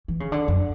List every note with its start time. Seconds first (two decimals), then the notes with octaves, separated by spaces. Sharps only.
0.08 E3
0.20 C#3
0.32 D3
0.48 F#2